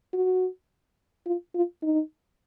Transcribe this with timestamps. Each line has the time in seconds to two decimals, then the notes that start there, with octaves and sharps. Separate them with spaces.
0.14 F#4
1.26 F4
1.55 F4
1.83 D#4